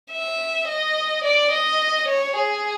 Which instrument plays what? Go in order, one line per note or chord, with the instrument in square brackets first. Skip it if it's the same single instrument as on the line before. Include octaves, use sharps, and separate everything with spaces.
[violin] E5
D#5
D5
D#5
C#5
G#4